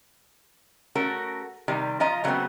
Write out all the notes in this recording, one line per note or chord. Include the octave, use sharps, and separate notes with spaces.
A3 C#4 F#4 A4 A#4
C3 D#3 G3
F3 F4 D#5 A#5
C#3 F#3 G3 A3 B3 C4